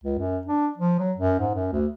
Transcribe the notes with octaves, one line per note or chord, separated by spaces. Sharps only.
C#2
F#2
D4
F3
F#3
F#2
G#2
F#2
D2